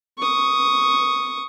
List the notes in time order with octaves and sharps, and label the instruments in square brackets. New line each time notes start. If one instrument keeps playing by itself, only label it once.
[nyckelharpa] C#6 D#6